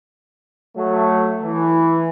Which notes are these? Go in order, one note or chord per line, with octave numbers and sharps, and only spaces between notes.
F#3 A3
E3